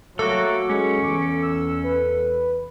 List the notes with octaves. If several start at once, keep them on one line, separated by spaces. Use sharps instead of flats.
F#3 A3 A#3 F#4 A4 D6
G#3 C#4
E2 D6
E6
B4